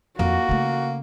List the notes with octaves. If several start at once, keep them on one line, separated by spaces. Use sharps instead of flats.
F2 A#3 F#4
C#3 A3